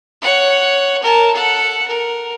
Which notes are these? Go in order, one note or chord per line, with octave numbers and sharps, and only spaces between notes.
C#5 F#5
A#4 A5
A4 F#5
A#4